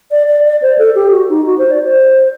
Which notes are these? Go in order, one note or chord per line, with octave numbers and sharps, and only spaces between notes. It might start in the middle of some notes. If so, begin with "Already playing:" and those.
D5
D5
D5
C5
A4
G4
F#4
D#4
F#4
C5
D5
C5